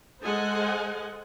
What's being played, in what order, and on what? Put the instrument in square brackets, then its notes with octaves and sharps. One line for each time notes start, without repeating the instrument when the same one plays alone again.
[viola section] G#3 A4 C5 D#5 F#5 G#5